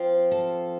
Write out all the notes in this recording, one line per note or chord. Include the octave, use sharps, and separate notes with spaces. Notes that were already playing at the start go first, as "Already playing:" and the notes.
Already playing: F3 C4 F4
A4